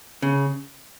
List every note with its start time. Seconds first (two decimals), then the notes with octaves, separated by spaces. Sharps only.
0.22 C#3